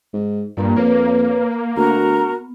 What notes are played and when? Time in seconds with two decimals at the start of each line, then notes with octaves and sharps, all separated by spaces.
0.13 G#2
0.57 G2 A#2 A#3 A#5
0.76 F2 A#3 B4 C#5
1.76 D2 B3 F#4 A#4 A#5